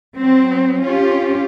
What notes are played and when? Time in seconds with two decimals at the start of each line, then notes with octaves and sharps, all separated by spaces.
0.18 F#3 C4
0.82 C#4 F4 G4